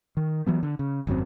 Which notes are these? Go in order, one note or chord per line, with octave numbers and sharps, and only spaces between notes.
D#3
E3 F#3 B3
D3
C#3
G#1 F#2 F#3 C4